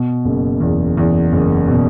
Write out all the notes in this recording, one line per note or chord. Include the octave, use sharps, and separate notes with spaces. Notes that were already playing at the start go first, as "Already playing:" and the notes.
Already playing: B2
F#1
E2
E2
F#1
B2